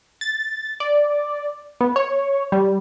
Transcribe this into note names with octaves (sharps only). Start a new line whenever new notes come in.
A6
D5
B3
C#5
G3